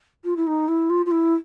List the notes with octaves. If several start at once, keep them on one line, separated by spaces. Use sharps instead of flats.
F4
E4
D#4
E4
F4
F4
E4